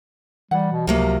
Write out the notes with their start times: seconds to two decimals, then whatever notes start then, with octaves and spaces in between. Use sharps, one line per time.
0.51 E3 G3 F#5
0.72 B2
0.87 C#2 C3 F3 F#3 A#3